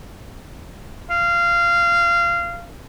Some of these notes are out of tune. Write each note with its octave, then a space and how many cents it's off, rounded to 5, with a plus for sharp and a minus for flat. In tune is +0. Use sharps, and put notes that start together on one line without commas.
F5 -20